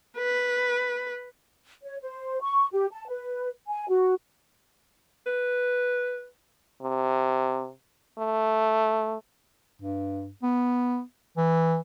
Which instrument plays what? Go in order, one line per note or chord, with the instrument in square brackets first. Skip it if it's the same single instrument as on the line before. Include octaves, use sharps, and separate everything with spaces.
[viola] B4
[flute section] C#5
C5
C#6
G4
A5
B4
G#5
F#4
[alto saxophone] B4
[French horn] C3
A3
[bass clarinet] G2
B3
E3